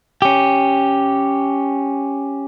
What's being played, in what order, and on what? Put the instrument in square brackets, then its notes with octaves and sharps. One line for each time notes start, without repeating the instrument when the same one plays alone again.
[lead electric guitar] C#4 G4